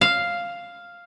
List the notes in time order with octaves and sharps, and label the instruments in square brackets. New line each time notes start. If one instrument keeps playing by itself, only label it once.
[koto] F5